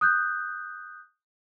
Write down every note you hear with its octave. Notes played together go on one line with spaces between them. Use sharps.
D#6 F#6 G6